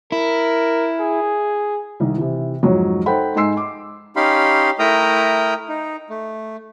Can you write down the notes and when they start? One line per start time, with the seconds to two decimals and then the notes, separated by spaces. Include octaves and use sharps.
0.12 E4 A#4
1.00 G#4
2.00 C2 D#3
2.18 C3 E3
2.63 F2 G#2 F#3 C#5
3.06 D#4 A4 C5 F#5 G5 B5
3.36 G#2 D#4 G#5 C6 E6 C7
3.57 D6
4.16 C#4 D#4 G4 F5 B5 C6
4.79 A3 E4 A#4 G5 A#5 D#6
5.69 D#4
6.10 A3